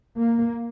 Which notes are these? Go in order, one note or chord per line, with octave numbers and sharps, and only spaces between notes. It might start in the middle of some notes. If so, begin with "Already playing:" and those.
A#3